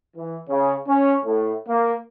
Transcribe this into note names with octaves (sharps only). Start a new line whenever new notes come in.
E3
C#3
C#4
A2
A#3